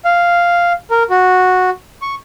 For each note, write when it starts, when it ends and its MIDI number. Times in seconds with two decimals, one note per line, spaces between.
0.05 0.73 77
0.91 1.03 70
1.10 1.70 66
2.02 2.15 85